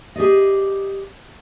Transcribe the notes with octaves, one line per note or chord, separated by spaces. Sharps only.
G4 G#4 D5 D#5